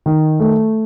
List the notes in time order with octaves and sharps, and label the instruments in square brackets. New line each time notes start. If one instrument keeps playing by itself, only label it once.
[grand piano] D#3
A3